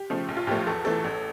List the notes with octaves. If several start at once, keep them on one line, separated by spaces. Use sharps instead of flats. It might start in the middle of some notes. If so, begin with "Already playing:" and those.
Already playing: G4
C#3 F3 A3
A#1
F4
A2 F3 A3 G4
E2 A4
E3 A3 A4
A1